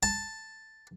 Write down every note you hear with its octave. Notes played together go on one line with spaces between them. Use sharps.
A5